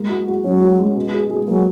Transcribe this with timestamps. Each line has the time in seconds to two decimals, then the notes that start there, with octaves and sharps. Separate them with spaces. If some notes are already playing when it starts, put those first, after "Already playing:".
Already playing: G#3 A#3
0.09 F#4
0.28 F#4
0.44 F#3 C#4
0.61 F#4
0.78 G#3
0.96 B2
1.14 G#4
1.30 G#4
1.47 F#3 A#3